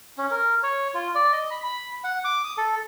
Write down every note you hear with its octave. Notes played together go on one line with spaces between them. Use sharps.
C#4
A#4
C#5
F4
D5
D#5
B5
B5
F#5
D6
D#6
A4